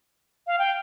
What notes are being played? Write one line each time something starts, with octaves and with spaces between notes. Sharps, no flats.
F5
G5